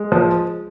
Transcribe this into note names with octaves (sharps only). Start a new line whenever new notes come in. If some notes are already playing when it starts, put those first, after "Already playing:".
Already playing: G#3
F3